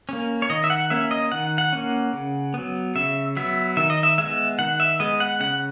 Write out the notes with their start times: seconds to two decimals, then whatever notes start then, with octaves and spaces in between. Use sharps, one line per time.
0.09 A#3 C#4
0.42 C#5
0.50 D#3 D#5
0.64 E5
0.70 F#5
0.90 A#3 C#4 E5
1.11 D#5
1.32 D#3 F#5
1.58 F#5
1.73 A#3 C#4
2.13 C#3
2.54 F#3 B3
2.95 C#3 E5
3.37 F#3 B3 E5
3.77 D#3 E5
3.90 D#5
4.03 E5
4.18 G#3 B3 E5
4.59 D#3 F#5
4.80 E5
5.00 G#3 B3 D#5
5.20 F#5
5.40 C#3 F#5